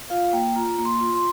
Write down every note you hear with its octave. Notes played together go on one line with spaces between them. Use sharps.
F4 F5
A#3 G5
F4 A#5
A#3
C6
F4
C6